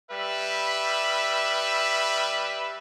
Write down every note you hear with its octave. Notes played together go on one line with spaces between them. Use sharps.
G3 B4 E5